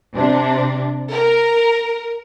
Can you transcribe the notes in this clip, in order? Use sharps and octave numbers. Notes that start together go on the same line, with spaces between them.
C3 D4
A#4